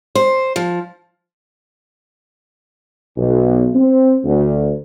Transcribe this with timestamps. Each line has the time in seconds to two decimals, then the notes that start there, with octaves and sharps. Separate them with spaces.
0.15 C5
0.56 F3
3.17 B1
3.75 C4
4.25 D2